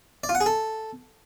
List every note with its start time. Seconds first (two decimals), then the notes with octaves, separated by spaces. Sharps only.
0.24 D5
0.29 F4
0.35 F#5
0.41 G#4
0.46 A4